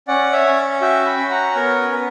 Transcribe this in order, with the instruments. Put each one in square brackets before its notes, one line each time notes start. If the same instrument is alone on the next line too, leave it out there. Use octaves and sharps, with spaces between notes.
[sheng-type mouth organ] C#4 D5 F#5
C#5 E5
C#4
F#4 E5 G5
G5 B5
C#4
F#5 A#5
B3 A#4 C#5
B3 B4